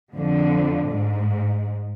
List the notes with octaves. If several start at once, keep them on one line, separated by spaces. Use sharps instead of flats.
F2 D3
G#2